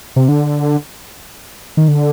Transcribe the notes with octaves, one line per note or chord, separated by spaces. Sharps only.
C3
D3
D#3
D3